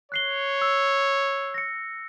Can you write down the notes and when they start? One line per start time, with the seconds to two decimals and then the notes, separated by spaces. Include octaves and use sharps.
0.12 C#5 F#6 C7 G7
0.62 E6
1.54 A#6 C#7